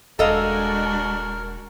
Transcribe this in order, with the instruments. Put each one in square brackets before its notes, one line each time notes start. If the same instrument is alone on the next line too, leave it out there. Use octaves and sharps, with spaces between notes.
[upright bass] D#1 [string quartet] G#3 D4 F#4 [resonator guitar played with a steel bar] A4 D#5 F5 [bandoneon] A#4